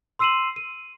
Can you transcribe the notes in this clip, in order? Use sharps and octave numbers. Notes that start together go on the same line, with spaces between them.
C6 E6 C7 D#7 E7 F#7
D#7